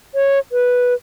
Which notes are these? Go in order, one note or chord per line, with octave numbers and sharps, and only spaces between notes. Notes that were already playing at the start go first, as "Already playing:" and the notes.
C#5
B4